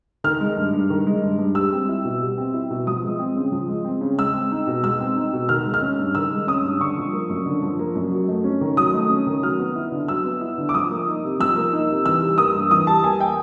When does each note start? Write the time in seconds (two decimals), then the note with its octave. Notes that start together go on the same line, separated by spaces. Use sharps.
0.24 D#3 F6
0.41 G#3
0.57 G2
0.73 G2
0.90 D#3
1.06 G#3
1.22 G2
1.38 G2
1.55 G3 E6
1.72 C4
1.88 E4
2.05 B2
2.21 G3
2.38 C4
2.54 E4
2.70 B2
2.87 F3 D#6
3.03 G#3
3.19 C4
3.36 C#3
3.52 F3
3.68 G#3
3.85 C4
4.01 C#3
4.18 G#3 E6
4.34 C4
4.51 D#4
4.67 B2
4.83 G#3 E6
5.00 C4
5.16 D#4
5.33 B2
5.49 D#3 F6
5.66 G#3
5.74 F6
5.82 C#4
5.99 G2
6.15 D#3 E6
6.31 G#3
6.47 C#4 D#6
6.64 G2
6.80 D3 C#6
6.97 F3
7.13 A#3
7.29 F#2
7.46 D3
7.62 F3
7.79 A#3
7.95 F#2
8.11 F#3
8.28 A3
8.44 C#4
8.61 D#3
8.77 F#3 D#6
8.94 A3
9.10 C#4
9.27 D#3
9.43 F#3 F6
9.59 B3
9.75 E4
9.92 D3
10.08 F#3 E6
10.25 B3
10.41 E4
10.57 D3
10.69 D6
10.74 F3 D#6
10.91 A#3
11.07 D#4
11.24 C3
11.40 F3 E6
11.56 A#3
11.73 D#4
11.89 C3
12.05 E3 E6
12.22 G3
12.38 A#3 D#6
12.55 G2
12.71 E3 D#6
12.87 G3 A5
13.04 A#3 G#5
13.20 G5